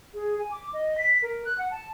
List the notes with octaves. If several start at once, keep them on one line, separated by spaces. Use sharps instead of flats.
G#4
G#5
D6
D#5
B6
A#4
F#6
F#5
A5